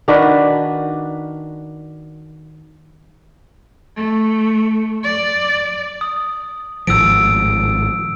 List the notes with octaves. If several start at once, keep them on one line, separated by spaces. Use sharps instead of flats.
D#3 D4 F#4 B4
A3
D5
D#6
G#1 A2 F3 E6 D7